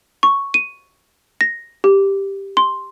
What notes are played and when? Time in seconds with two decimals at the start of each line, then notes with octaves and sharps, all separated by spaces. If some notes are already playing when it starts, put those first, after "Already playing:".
0.23 C#6
0.54 D#7
1.41 A#6
1.84 G4
2.57 C6